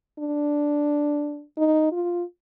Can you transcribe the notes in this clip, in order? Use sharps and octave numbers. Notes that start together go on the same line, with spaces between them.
D4
D#4
F4